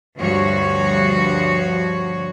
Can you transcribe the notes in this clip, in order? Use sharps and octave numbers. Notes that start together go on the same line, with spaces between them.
D2 G2 F3 F#4 C#5